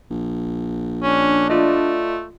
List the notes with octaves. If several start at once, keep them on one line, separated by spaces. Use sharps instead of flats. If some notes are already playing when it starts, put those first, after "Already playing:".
A#1
C#4 D4
A3 F4 D5 D#5